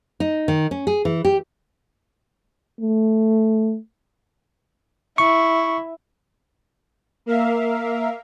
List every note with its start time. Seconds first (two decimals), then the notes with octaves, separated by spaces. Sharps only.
0.20 D#4
0.48 D#3
0.71 C#4
0.87 G#4
1.05 E3
1.25 G4
2.80 A3
5.18 E4 C#6
7.26 A#3 A#4 E5 F5